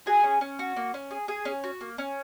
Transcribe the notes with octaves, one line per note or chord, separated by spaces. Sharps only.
F#4 G#4 G#5
C#4
C#4
F#4
A#3
C#4
G#4
G#4
C#4
F#4
A#3
C#4